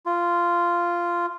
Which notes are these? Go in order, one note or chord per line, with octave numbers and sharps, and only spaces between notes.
F4